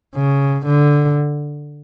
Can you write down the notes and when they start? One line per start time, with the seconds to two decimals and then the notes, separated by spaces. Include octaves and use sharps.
0.16 C#3
0.66 D3